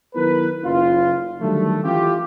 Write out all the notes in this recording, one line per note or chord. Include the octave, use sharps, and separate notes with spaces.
D#3 F#3 B3 E4 A#4 B4
F#1 F4
D3 D#3 F#3 G3 A3
E3 C#4 F4 G4